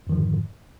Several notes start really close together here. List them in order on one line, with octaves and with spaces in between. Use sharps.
F2 D#3 F3 D3 G#2